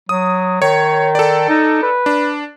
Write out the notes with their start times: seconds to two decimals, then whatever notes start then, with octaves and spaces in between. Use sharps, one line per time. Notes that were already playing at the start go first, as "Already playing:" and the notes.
0.09 F#3 D#6
0.62 D#3 C#5
1.15 A4 D5
1.49 D#4
1.83 B4
2.06 D4